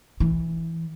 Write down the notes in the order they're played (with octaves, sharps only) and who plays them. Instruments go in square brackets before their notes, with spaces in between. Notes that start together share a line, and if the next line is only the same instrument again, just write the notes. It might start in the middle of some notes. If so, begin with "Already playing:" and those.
[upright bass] E3